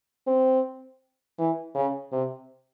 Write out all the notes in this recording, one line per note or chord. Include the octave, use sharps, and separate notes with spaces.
C4
E3
C#3
C3